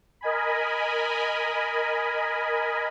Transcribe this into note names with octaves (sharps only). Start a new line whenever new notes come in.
A#4 D#5 G#5 B5